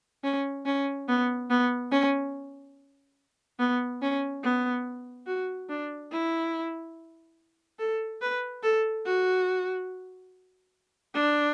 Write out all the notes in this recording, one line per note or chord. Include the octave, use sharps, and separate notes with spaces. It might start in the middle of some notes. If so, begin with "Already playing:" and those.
C#4
C#4
B3
B3
C#4
B3
C#4
B3
F#4
D4
E4
A4
B4
A4
F#4
D4